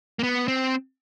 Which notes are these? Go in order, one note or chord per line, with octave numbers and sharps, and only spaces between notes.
A#3
B3
C4